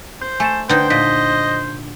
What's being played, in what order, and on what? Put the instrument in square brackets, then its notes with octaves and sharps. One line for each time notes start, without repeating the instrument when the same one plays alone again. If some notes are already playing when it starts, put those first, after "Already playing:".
[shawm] C5 [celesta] G6
[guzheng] A3 [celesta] G#5 A6 E7
[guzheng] D3 D#4 [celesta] B4 [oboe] C5 [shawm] G5
[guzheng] A#2 [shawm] D#5 [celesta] B6